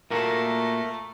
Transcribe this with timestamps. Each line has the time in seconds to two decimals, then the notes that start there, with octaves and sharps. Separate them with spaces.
0.10 A#2 A3 A#3 F#4 A#4 E5